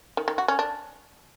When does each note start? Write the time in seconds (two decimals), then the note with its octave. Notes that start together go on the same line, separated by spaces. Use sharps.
0.17 D#3
0.28 D#3
0.38 F#4
0.48 C#4
0.59 D4